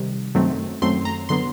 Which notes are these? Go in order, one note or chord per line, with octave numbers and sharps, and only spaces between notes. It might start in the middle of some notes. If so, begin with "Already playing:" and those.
Already playing: C3 D#3 G3
F#2 D#3 F#3 A3 C4
F#2 D#3 F#3 A3 C4 C6
A#5
D3 F#3 B3 C6